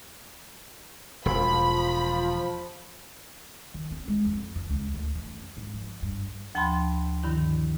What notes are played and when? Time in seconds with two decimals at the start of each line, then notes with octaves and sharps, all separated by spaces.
1.26 E1 F3 B5
3.74 D#3
3.91 C4
4.08 G#3
4.25 F2
4.56 E3
4.70 C#2
4.94 D2
5.15 E3
5.30 F#2
5.57 G#2
5.74 F3
6.02 G2
6.55 D2 F3 G5 A5 B5 C6
7.23 G2 D3 D#3 E4